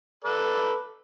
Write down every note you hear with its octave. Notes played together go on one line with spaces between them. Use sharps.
A4 B4 D5